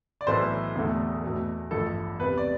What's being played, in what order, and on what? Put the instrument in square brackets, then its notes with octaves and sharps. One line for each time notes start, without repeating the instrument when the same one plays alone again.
[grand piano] D5
B1 A2 E3 A3 C5
E1 E2 D3 A3
E2 B2 A3
A1 G2 F3 A3 A4
E2 C3 G3 B4
D5